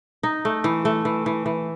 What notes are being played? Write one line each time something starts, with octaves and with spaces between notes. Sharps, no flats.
D#4
A3
E3
A3
E3
E3
E3